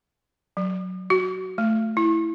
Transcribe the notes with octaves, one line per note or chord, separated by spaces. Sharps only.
F#3
F#4
A3
E4